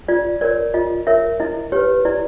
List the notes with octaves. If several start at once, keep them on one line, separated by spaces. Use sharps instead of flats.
F4 D5
A#4 C#5 D5
F4 D#5
A#4 C#5 E5
E4 D#5
G4 B4 C#5
E4 D5